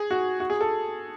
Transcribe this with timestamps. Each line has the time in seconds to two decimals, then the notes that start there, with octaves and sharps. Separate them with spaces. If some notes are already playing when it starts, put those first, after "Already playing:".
Already playing: G#4
0.11 F#4
0.40 F#4
0.50 G#4
0.61 A4